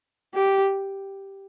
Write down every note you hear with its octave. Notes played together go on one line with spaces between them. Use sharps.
G4